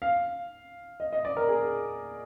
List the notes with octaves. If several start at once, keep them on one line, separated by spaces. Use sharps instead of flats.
F5
D#5
D#5
D5
A#4
G#4